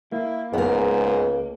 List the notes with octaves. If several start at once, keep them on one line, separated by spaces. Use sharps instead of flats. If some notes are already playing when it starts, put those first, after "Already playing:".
A#3 E4
C#2 G#2 B3 A#4